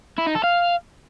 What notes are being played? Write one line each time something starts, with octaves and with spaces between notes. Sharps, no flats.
E4
D#4
A4
F5